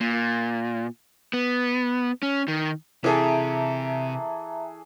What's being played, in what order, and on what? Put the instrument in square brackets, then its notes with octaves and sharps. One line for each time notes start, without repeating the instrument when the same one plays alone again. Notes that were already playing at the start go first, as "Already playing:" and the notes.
[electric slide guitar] A#2
B3
C#4
D#3
[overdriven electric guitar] C3 [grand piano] E3 G#4 A4 [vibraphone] E5 A5 A#5